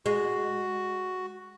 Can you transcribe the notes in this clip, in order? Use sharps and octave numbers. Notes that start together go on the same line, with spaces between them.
G#3 F#4